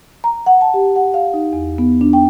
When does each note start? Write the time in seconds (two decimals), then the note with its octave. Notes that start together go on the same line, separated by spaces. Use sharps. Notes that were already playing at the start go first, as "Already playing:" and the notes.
0.24 A#5
0.46 F#5
0.61 A5
0.74 G4
0.96 F#5
1.14 F5
1.34 D#4
1.53 E2
1.78 B3
2.01 D4
2.13 G5